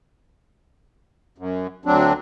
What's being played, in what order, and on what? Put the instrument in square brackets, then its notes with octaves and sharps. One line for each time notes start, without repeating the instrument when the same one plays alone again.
[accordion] F#2
D2 F#3 C4 D4